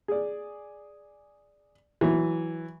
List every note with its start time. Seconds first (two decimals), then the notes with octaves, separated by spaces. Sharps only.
0.08 G#4 D5
2.01 E3 F#3